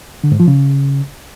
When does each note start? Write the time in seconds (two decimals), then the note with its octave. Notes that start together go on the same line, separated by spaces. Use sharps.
0.24 D3
0.32 G#2
0.40 F3
0.48 C#3